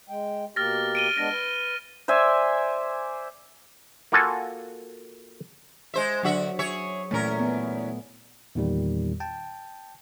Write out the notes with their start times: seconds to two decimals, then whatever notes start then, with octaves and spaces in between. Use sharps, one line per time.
0.09 G#3 G5
0.56 B2 A#3 G4 F6 A6 A#6
0.95 D7 D#7 G7
1.17 G#3 B3 D4 A#6
1.31 B4
2.08 C5 D5 E5 G#5
4.12 A#3 F4 F#4 A4 G#5
5.94 G#3 C5 E5
6.23 D3 F#3 F#4 E5
6.59 G#4 C#5 E5
7.11 E2 A#2 A3 C#4 A#4
7.39 B3
8.55 E2 A#2 D#3 G3
9.20 G5 A5